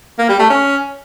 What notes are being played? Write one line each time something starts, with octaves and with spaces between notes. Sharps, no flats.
A#3
G3
A3
C#4